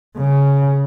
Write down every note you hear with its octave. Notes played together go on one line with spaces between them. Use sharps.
C#3